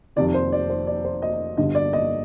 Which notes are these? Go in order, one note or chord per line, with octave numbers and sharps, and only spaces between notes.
F1 F2 C3 D#3 D5
C5
D5
C5
D5
C5
D#5
G1 G2 D3 D#5
D5
D#5